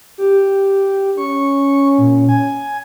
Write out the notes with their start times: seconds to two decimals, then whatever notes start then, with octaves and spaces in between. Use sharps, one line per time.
0.18 G4
1.18 C#4 C#6
1.98 A#2
2.29 G#5